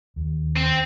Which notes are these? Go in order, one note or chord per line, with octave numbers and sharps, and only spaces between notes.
D#2
C4